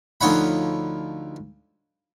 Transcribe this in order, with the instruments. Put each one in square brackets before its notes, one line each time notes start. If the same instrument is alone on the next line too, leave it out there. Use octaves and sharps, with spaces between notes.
[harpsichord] D2 F3 D#4 C#5 F#5 B5